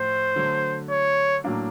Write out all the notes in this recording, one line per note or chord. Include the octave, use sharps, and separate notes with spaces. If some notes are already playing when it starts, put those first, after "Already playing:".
Already playing: A2 F3 C5
D3 F#3 A3
C#5
A2 F#3 A#3 D4